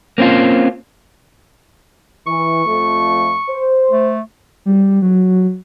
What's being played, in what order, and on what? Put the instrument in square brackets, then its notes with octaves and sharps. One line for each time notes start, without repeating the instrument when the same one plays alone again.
[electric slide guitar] A#3 C4 C#4 F4
[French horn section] E3 [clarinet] C#6
[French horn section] F2 F3 A3
C5
[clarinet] A3
[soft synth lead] G3
F#3